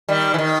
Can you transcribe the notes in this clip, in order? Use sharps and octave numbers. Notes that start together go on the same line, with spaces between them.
D#3 G3
E3
D#3